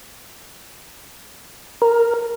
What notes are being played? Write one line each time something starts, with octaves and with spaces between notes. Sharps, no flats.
A#4